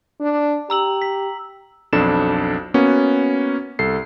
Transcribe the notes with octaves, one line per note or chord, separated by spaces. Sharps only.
D4
G4 A#5 E6 F#7
B6
B1 F2 D4 A4 E7
A#3 B3 C#4 F#4
C2 A4 C7